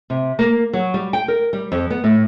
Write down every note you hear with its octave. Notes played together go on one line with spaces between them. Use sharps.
C3
A#3
F#3
G3
G5
A#4
G3
F2
B3
A2